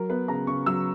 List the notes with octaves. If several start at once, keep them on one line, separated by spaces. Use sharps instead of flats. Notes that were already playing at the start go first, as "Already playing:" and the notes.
Already playing: F#3 A#4
B3 B4
C#3 A#5
C#3 C#6
F#3 E6